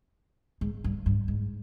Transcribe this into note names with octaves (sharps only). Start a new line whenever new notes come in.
G#2
G2
G2
G#2